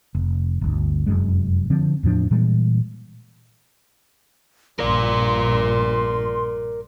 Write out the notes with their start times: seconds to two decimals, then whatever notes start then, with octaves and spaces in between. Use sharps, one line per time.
0.15 F1
0.61 G1 D2
1.06 F1 C2 F#2 G#3
1.70 D3 F3 C4
2.03 E2 A2 F3 D4
2.31 A#2 E3 G3 G#3
4.79 A#1 G2 A#4 D5 C6